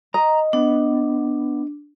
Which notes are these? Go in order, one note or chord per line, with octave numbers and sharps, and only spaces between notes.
D#5 A#5
B3 D4